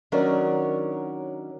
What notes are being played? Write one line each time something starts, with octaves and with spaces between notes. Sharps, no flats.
D#3 F#3 C#4 D4 A#4 C#5